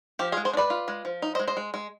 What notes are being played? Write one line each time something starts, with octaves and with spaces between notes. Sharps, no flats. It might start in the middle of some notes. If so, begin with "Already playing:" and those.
F3 G4
F4 G#4
G#3
G#4 C5
D4
B4 D5
F4
G#3
F3
D#4
C5 D#5
G#3
C5 D#5
G#3
G#3